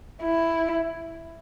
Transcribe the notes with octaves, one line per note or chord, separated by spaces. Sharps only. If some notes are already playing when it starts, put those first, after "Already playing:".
E4